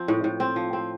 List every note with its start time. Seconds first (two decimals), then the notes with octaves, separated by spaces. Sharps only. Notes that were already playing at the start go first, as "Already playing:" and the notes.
Already playing: F3 C4
0.08 A2
0.24 A2
0.40 C4
0.56 F3
0.73 C4